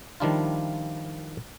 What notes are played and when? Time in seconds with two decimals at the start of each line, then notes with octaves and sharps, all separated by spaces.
0.20 D#3 F3 G3 D4 E4 F4